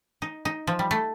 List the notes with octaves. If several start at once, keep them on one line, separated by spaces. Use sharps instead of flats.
D#4
D#4
F3
G3
A3